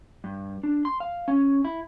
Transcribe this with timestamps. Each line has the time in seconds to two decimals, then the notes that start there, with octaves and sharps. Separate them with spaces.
0.24 G2
0.63 D4
0.85 C6
1.00 F5
1.28 C#4
1.65 E4